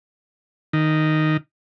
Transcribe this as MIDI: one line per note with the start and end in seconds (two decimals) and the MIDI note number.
0.73 1.37 51